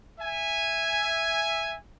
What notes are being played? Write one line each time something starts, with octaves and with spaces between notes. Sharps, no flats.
E5 G#5